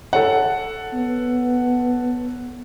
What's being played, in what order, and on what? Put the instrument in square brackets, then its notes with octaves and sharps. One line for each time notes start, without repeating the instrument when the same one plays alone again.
[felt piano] A4 C#5 F#5
[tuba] B3